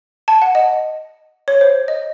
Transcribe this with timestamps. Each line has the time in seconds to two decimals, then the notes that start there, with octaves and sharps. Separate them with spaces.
0.28 A5
0.42 F#5
0.55 D#5
1.48 C#5
1.61 C5
1.88 D#5